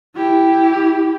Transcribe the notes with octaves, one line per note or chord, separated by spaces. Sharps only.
E4 G4